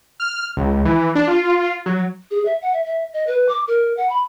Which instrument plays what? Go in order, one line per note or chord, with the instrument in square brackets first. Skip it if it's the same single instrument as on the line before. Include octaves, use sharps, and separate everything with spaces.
[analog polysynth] F6
C#2
E3
D4
F4
F#3
[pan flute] G#4
E5
F#5
E5
E5
D#5
B4
D6
A#4
F#5
B5